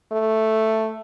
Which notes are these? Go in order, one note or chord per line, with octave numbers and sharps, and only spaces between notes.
A3